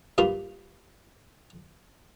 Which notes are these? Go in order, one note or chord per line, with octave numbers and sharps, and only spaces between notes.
G2 A#2 A#3 F4 B5